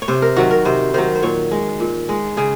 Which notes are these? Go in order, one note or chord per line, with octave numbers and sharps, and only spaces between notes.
C#5
C3 C5
A#4
D#3 F#3 F#4
A#4
C3 C5
D#3 F#3 C5
C5
A#2 C#5
G#3
A#2
G#3
C#3 G#4